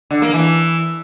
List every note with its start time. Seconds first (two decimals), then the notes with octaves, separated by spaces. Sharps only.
0.10 D3
0.22 A#3
0.34 E3